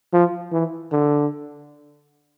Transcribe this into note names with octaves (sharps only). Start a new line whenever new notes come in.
F3
E3
D3